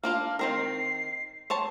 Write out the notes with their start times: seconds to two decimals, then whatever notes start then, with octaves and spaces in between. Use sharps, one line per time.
0.04 A#3 D4 F4 F6
0.39 D#3 C4 A#4 C7
1.50 C5 C#5 A5